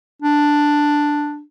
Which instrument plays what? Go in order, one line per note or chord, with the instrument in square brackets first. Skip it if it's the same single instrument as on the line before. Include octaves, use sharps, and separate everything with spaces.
[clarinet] D4